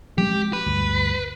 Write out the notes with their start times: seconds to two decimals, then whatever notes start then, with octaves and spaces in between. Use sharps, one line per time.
0.18 F3 G#3 C4 G4
0.53 B4
0.66 D2 G2